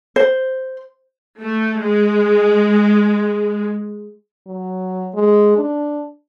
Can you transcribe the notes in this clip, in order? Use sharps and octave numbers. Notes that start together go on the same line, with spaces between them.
C5
A3
G#3
F#3
G#3
D4